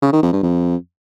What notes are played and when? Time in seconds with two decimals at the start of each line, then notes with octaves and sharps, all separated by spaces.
0.02 C#3
0.12 D#3
0.23 F2
0.33 G2
0.43 F2